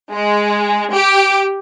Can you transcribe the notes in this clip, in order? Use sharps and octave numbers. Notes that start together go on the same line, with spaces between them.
G#3
G4